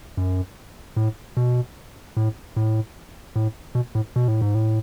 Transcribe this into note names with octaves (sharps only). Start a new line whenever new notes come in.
F#2
A2
B2
A2
A2
A2
B2
A2
B2
A2
G#2
A2